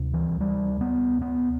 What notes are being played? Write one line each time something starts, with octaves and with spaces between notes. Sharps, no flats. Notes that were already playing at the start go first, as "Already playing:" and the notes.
Already playing: D2 C3
E3
G3
B3
B3